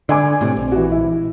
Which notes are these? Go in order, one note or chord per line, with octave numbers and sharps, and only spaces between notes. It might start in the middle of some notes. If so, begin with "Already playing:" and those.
D3 D5 G#5 D6
A2 C3
A#1 C4
E3 F#4
E4